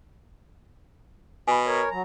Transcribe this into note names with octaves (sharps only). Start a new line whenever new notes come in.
B2 G#5 B5
A#4 C#5
F#3 A#5